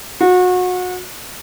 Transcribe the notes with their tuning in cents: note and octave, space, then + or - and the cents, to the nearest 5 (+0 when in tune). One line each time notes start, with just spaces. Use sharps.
F#4 -30